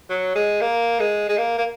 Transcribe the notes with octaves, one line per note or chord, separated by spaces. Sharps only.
F#3
G#3
A#3
G#3
G#3
A#3
A#3